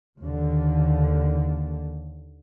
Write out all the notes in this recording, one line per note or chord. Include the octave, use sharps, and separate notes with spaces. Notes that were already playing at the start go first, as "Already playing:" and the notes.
D#2 D3